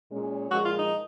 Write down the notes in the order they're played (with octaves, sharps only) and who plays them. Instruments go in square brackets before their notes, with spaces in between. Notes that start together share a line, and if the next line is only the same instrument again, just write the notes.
[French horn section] A#2 G#3 C#4
[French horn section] A#2 F3 G#3 [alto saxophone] F#4
[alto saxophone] F4
D#4